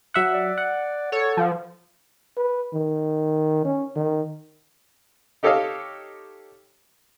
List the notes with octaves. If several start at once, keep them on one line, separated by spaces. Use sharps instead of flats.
F#3 E5 F#5
D5
F#5
A4 C#5
F3
B4
D#3
C#4
D#3
D#4 G4 A4 C#5 D#5 F5